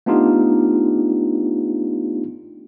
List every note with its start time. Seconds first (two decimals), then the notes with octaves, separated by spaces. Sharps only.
0.06 A3 B3 D4 D#4 F4 G4